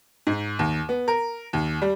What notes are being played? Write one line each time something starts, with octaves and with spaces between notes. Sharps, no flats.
G#2
D#2
B3
A#4
D#2
G3